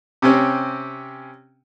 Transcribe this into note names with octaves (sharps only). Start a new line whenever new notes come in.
C3 C4 C#4